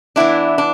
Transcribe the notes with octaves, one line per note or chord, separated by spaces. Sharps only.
E3 B3 D4 E4
D4